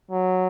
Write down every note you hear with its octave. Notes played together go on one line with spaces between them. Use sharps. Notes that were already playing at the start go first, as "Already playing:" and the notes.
F#3